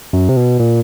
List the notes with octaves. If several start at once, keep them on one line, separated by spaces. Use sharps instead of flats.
F#2
C3
B2
A#2